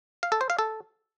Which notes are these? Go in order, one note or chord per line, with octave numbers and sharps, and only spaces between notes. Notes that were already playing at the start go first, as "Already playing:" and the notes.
F5
A4
C5
F5
A4